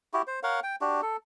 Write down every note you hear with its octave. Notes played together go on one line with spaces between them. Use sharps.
E4 F#4 G4
C5
A#4 C#5 F5 F#5
G5
D4 F#4 G4
A4